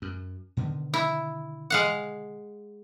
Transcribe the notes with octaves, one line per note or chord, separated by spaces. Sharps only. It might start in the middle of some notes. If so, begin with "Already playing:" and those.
F#2
B2 D3 D#3
E4
G#3 F5 F#5